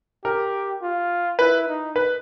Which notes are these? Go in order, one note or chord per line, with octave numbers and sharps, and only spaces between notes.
G4 A#4
F4
E4 B4
D#4
B4